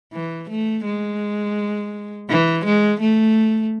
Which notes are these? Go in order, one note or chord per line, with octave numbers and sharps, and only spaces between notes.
E3
A3
G#3
E3
G#3
A3